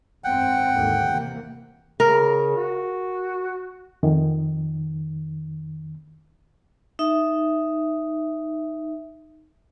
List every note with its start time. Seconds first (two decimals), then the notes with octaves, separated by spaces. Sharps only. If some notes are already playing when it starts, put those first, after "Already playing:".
0.24 G#1 F#2 C4 F#5 G5
0.73 D#2 G#2 D3
1.10 C3 E3 A#3
2.00 C#3 A#4
2.56 F#4
4.03 F2 D#3
6.99 D#4 E5